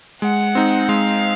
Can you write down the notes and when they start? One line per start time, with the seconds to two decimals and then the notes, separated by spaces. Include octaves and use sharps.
0.22 G#3 F#5
0.55 C4 D#4
0.89 G#3 F5